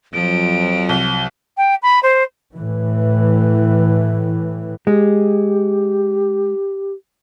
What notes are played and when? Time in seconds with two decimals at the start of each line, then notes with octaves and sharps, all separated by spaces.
0.14 F2 F3 F#3 D7
0.89 C2 G7
1.57 G5
1.82 B5
2.02 C5
2.55 A2 E3
4.87 G#3 G4